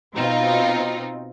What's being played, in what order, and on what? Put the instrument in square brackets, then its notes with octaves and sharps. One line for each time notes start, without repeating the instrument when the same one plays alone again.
[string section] B2 C4 D#4 F4